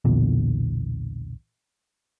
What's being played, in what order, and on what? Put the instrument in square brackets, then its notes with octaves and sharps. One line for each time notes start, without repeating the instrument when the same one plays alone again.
[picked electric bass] B1 E2 A#2 D3